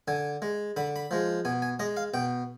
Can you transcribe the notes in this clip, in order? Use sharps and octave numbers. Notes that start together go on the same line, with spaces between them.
D3 G#5
G#3
D3 B5
B5
F3 G#3
B2 G#5
G#5
G#3 D#5
F5
B2 G5